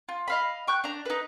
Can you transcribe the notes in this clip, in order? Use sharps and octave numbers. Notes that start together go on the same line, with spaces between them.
F4
D#5 F5 B5
G5 C#6 F#6 G6
D4 A#5
D#4 B4